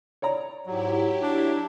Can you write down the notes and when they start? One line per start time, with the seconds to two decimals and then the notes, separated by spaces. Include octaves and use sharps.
0.22 C#5 D5 A#5
0.66 G#2 F#3 E4 G4
1.23 D4